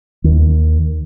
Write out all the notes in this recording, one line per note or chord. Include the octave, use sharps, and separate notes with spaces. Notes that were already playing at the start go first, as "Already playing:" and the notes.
D#2